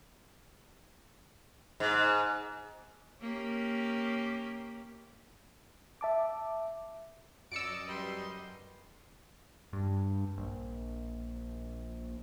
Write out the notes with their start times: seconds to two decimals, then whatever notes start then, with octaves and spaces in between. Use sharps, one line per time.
1.80 G#2
3.21 A#3 C#4 G4
6.01 E5 A5 D6
7.52 F#2 D5 D#5 E6 C#7 D7
7.89 G3 B4 C6
9.73 G2
10.38 A#1